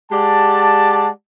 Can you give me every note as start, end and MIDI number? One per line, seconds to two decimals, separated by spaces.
0.12 1.09 56
0.12 1.09 67
0.12 1.09 74
0.12 1.09 78
0.12 1.09 81